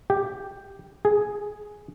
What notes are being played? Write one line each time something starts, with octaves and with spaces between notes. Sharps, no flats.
G4
G#4